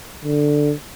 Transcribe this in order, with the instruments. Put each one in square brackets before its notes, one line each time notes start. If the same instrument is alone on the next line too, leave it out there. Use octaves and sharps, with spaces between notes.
[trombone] D3